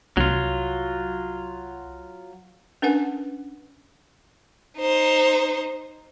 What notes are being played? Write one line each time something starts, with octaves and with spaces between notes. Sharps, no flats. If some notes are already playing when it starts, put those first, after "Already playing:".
C2 F#3 F4
C#4 D4 A#4 B4 F#5 G#5
D#4 C5